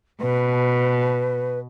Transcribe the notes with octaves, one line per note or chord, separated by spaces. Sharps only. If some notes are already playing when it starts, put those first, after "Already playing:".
B2 B4